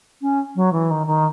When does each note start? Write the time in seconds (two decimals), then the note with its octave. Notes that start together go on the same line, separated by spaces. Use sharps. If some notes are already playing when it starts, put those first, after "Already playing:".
0.21 C#4
0.55 F#3
0.72 E3
0.91 D#3
1.07 D#3